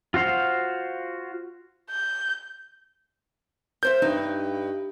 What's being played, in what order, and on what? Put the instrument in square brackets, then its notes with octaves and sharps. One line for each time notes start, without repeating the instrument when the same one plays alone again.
[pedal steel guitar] F4 F#4 C5 F5
[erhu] G6
[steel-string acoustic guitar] A#4 C5 E5 [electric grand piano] G6
[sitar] G2 [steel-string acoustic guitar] D#4